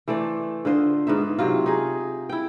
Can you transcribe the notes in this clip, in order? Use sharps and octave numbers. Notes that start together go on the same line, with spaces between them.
E3 A3 C5 D5
D3 F4 C5 D#5
G#2 B3 D#4 E5
C3 F#3 F4
D#4 G#4
E4 G5